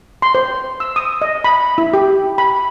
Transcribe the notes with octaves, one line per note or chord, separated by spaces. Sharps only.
C6
C5
E6
D#6
D#5
B5
E4
G4
B5